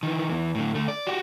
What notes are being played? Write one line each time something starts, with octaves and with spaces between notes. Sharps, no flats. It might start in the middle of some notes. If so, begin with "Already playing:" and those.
D#3 E3
E2 E3
A2 D3
D2 A3
D5
F#4 G4